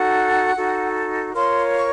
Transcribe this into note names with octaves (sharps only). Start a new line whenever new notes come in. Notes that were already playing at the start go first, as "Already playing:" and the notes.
Already playing: D#4 F#4 A4 F#5
D#4 F#4 A4
F4 A#4 C#5 C6
C#6